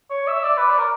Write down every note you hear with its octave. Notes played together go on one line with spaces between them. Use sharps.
C#5
E5
D5
B4
D5
A#4